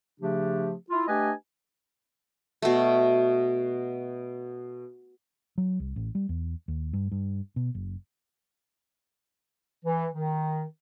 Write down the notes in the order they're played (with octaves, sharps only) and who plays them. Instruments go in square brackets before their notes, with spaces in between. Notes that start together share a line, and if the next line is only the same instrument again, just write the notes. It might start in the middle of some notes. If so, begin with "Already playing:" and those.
[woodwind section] C#3 F3 A3 D4 G4
E4 F4
A3 D4 G4 B4 D#5 G#5
[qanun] B2 A3
[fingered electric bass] F#3
C2
A1
G3
E2
D#2
G2
G2
B2
F#1
[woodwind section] E3
D#3